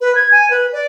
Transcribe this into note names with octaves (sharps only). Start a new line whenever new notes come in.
B4
G#6
G#5
B4
D5